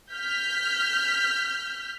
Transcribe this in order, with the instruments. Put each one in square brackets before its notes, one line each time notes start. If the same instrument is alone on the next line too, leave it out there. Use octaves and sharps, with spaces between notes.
[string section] F6 G6 B6